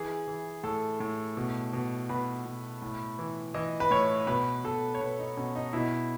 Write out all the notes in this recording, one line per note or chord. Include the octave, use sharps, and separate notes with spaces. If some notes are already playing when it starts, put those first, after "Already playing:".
Already playing: E3 G#4
E3
A2 A4
A2
B2
B2
B2 B4
B2
A2
E3
E3 D#5
B4
A2 C#5
B2 B4
B2 A4
C#5
B2 B4
D#4
B2 C#4
D#4
B2 E4